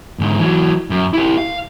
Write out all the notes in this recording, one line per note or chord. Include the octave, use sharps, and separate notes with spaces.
G#2 D3
E3 F#3
F#2
E4 G4
F5